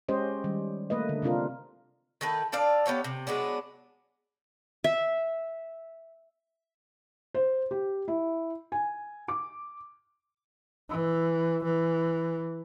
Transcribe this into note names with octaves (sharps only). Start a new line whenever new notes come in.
G#3 C#4 G4 C5 D#5
D#3 G3
A3 A#3 B4 D#5
D3
C3 C4 D4 F4 A#4
D#3 A3 A4 B4
D4 A4 D5 F5
B3 G4 C#5 F5
C3
F#3 G#3 B3 D4
E5
C5
G4
E4
G#5
D6
E3
E3